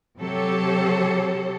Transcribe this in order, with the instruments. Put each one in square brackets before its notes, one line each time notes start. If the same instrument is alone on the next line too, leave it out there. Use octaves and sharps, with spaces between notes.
[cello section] C3 F#3 G4 A4 C#5